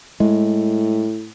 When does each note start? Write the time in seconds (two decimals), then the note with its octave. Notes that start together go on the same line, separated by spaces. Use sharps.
0.20 A2 G#3